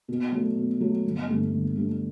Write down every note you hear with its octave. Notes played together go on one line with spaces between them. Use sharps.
B2
F#3 A3
B2
F#3 A3
G1
G2 D3 A3
G1
G2 D3 A3